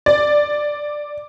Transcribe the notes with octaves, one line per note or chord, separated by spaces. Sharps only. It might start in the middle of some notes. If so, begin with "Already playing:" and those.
D5